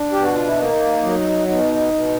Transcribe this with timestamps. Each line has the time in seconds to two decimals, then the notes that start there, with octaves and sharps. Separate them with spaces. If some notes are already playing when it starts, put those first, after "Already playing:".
Already playing: D4
0.12 B2 G4
0.23 F#4
0.34 F4
0.46 E4
0.57 A#3 D#4
1.03 F#3
1.48 B2 D#4
1.93 B2